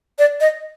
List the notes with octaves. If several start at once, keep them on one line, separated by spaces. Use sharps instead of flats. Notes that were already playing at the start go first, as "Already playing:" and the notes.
D5
D#5